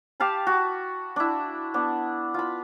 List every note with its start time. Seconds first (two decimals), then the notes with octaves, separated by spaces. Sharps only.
0.20 G4 F5 A5 B5
0.47 F#4
1.16 D4 E4
1.74 B3 D4
2.34 F4 B5